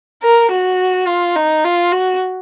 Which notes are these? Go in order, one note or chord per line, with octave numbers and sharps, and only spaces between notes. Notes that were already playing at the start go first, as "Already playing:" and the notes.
A#4
F#4
F4
D#4
F4
F#4